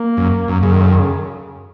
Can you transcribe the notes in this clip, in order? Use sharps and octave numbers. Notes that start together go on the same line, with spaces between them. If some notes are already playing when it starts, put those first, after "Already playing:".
Already playing: A#3
F#2
F#2
F#2 C#3
D#3
C#3
D#3
C#3